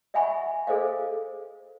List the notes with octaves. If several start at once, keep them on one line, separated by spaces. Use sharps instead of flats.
D#5 E5 F#5 G#5 B5 C#6
G#4 A4 C5 D#5 F5